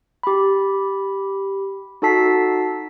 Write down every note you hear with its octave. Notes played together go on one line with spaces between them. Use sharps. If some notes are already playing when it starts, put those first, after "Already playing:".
G4 B5
D#4 F#4 A4 A5 B6 C7